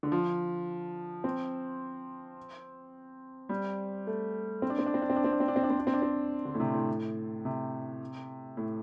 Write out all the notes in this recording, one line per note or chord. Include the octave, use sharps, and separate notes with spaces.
D3
F3
C4
G3
A3
C4
D4
C4
D4
C4
D4
C4
D4
C4
D4
C4
D4
C4
D4
C4
D4
C4
D4
C4
D3
A2
C3
A2
C3
A2